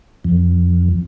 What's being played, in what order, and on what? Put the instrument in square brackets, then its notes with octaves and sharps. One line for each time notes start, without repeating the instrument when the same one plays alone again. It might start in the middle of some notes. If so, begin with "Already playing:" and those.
[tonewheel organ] F2